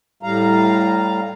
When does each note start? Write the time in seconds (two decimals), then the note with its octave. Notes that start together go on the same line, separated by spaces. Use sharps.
0.23 A2 G3 F5 A#5